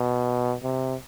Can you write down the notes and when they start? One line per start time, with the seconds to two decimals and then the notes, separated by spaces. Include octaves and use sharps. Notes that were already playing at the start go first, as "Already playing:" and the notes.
Already playing: B2
0.63 C3